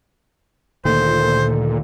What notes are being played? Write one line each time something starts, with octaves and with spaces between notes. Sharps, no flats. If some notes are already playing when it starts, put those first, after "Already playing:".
D2 A#2 D#3 A4 C5